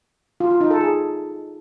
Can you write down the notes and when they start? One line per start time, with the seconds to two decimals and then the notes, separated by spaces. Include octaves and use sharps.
0.40 F4
0.50 F4
0.61 D#4
0.71 A4
0.81 G#4